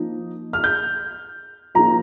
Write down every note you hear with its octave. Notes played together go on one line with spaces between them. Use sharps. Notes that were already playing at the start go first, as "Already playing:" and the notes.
Already playing: F3 A#3 D#4
F6
G6
F3 A#3 D#4 A#5